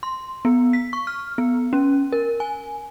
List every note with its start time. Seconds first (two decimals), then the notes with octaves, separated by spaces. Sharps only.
0.03 C6
0.45 B3
0.73 B6
0.93 C#6
1.07 F6
1.38 B3
1.73 C#4
2.13 A#4
2.40 G#5